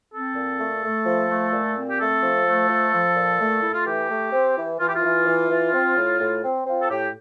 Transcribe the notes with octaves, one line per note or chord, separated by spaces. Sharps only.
C4 A4
A#2
A3
A3
F3
A3
A#2
C4
G4
A3 A4
F3
A3
F3
F3
A#2
A3
A3 E4
F4
E3 G4
A3
C4
E3
E3 F4
G4
F4
E3
E3
E3
C4
A2
A2
C4
C4 F4
A4
A2 G4